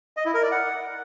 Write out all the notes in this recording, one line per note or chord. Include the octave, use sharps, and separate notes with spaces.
D#5
E4
A#4
D5
F#5